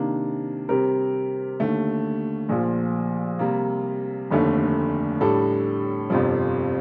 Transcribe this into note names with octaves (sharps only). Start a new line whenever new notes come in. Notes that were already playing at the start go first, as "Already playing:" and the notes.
Already playing: C3 D#3 A#3 D4
C3 G3 C4 G4 A#4
D#2 D3 A3
A#1 A#2 F3
C3 G3 A#3
F1 D#2 D3 A3
A2 G3 D4 A4
G1 F2 C3 F3